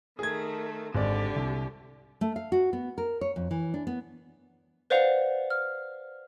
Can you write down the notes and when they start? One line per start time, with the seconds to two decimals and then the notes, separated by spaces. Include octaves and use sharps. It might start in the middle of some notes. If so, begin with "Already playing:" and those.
0.19 D#3 A3 G#4 G#6
0.95 G#1 D3 G4 D5
1.36 C2
2.21 A3
2.36 F5
2.52 F#4
2.73 B3
2.98 A#4
3.21 C#5
3.36 F2
3.51 E3
3.74 D4
3.87 B3
4.90 B4 C5 D5 F5 F#5 F7
5.50 F6